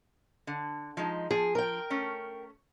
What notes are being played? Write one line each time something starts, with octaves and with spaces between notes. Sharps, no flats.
D3
F3 G#3 D#4
F3 G#4
A#4 G5
A3 C#4